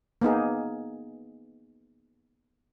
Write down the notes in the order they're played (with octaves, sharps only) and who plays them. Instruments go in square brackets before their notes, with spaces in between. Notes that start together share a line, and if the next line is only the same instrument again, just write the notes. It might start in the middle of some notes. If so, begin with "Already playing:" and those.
[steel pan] A#3 B3 D#4 G#4